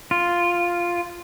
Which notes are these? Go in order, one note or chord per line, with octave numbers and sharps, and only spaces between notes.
F4